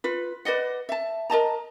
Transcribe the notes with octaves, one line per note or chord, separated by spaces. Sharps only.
F4 B4
B4 D5 D#5 F#5
E5 A5
A#4 D#5 A5 A#5